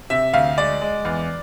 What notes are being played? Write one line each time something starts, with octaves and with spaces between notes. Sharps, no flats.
C3 E5
D2 F5
G#3 D5
G#3
E2